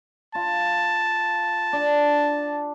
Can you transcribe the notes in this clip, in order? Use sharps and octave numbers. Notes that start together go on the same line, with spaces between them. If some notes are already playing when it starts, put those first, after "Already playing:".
F4 A5
D4